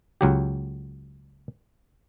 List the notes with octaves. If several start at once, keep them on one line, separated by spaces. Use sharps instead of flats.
C#2 F#3 G4